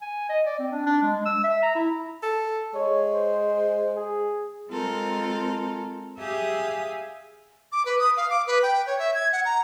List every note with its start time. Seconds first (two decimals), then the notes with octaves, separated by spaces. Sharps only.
0.02 G#5
0.29 D#5
0.46 D5
0.59 C4
0.72 D4
0.86 D4
1.02 G#3
1.26 E6
1.44 E5
1.63 A#5
1.75 E4
2.23 A4
2.74 G#3 C#5
3.14 C5
3.96 G#4
4.70 G#3 C4 F4 A4 A#4
6.19 G4 G#4 E5 F5 D#6
7.72 D6
7.85 B4
7.99 D#6
8.17 F5
8.30 D6
8.47 B4
8.63 G5
8.86 C#5
8.99 E5
9.14 G#6
9.32 F#5
9.45 A#5